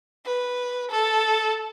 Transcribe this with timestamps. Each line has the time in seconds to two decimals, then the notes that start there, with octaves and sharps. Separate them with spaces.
0.26 B4
0.91 A4